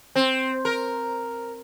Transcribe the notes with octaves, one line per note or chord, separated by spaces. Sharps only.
C4
A#4